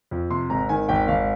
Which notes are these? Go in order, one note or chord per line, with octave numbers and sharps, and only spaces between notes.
F2
C3 C6
G#1 A#5
D#3 G#5
G#1 G5
G#1 F5